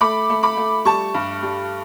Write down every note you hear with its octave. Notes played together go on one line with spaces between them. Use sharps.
A3 B5 D6
A3
B5 D6
A3
G3 A5 C#6
G2
G3